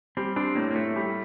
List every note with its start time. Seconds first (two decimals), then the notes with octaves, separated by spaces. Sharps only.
0.17 G3 C4
0.36 C4 D4
0.55 A2 A#3
0.71 A#3
0.75 A2 A3
0.96 G3